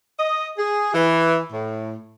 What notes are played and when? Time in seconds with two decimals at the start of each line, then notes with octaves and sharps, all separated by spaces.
0.19 D#5
0.58 G#4
0.94 E3
1.52 A2